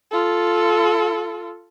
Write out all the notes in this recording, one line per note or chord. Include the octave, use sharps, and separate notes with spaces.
F4 A4